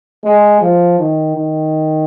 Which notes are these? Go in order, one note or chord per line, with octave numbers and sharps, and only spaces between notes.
G#3
F3
D#3
D#3